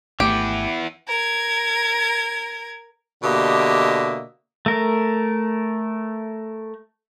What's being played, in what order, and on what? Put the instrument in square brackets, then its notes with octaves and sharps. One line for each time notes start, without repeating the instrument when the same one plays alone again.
[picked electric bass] G#1 A3 [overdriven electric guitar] E3 B3 [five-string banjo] G4
[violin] A#4 G#6
[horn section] B2 D3 A#3 G4 D#5 E5
[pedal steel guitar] A3 A#4